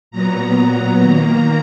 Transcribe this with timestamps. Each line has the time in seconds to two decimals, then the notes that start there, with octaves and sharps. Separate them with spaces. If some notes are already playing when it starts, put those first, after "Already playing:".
0.11 A#2 F#3 B3 A#5
1.02 D#3 A#3